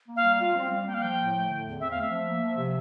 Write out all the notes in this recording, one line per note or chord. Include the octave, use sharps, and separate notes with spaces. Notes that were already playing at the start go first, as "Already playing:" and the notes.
A#3
F5
G3
F4 F5
C4
F5
G3
A#3 G5
F5
F3 G5
A2
A3
D3
E2
C4 E5
A3 F5
E5
F3
A#3
F3
C3